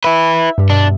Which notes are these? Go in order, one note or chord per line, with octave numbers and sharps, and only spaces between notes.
E4 B4 E5
G2 G3
B2 D4